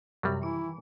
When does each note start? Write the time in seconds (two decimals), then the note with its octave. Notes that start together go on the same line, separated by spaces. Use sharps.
0.23 F#2 C3 F#3 G3
0.42 D#3 E3 E4